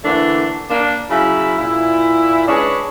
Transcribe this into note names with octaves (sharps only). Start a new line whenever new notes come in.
D3 E3 A3 A#3 D4
A#3 D4
C#3 F#3 E4
A#2 E4
G#3 C#4 D4 G#4 B4